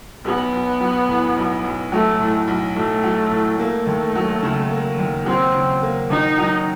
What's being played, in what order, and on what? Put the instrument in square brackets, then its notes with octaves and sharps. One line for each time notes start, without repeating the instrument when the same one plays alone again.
[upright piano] B1 [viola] B3
[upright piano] B1
F#3
A2
B1
B1
[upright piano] F#3 [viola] A3
[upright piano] A2
B1
[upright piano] B1 [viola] A3
[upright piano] F#3
A2
[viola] A3 [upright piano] A#3
[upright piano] D#2
F#3
C#3
A#3
D#2
[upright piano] F#3 [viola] C4
[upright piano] C#3
A#3
[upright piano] D#2 [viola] D#4
[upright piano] F#3